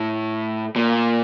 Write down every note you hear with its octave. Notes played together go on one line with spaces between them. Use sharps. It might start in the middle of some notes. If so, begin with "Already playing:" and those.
Already playing: A2
A#2